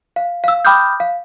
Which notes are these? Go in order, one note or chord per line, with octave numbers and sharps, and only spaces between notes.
F5
F5 E6
G5 B5 D6 D#6 F6 G6
F5